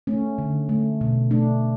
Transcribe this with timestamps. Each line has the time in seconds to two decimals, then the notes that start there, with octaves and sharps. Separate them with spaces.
0.07 A3 C#4
0.38 D3
0.69 A3
1.01 B2
1.31 A3 D4